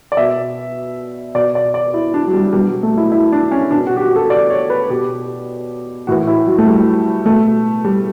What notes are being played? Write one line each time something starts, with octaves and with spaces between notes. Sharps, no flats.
D5
B2 E5
B2 D5
D5
D5
E4
D4
F#3
G3
B2 G3
F#3
A3
E4
E4
D4
C#4
B2 D4
F#4
G4
F#4
A4
D5
C#5
B4
B2 G4
A2 E3 F#4
E4
F#3
A3
G3
B2 A3
G3